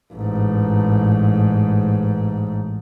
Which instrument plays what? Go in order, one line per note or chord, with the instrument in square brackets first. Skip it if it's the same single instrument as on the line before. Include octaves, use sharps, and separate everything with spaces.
[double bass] A1 G#2